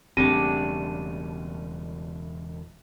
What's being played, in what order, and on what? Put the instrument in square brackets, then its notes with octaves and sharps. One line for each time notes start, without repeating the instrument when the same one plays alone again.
[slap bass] E1 C#3 [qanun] G3 A3 D4 [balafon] C4 [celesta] D#7